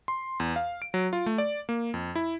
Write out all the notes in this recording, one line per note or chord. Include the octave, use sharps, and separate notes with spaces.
C6
E2
F5
D7
F#3
F4
A3
D5
A#3
F2
E4